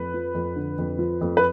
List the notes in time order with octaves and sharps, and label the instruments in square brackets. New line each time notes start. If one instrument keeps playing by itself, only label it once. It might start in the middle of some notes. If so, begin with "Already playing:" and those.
Already playing: [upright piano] F2 [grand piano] B4
[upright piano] F3
F2
D3
F2
F3
F2
[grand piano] B4